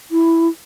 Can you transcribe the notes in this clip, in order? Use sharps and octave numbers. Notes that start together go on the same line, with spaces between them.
E4